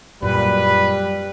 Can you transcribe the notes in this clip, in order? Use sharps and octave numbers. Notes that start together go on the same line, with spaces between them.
F#2 A#2 G3 B4